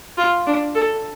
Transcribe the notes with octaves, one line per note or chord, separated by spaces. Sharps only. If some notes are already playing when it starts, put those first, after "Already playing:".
F4
D4
A4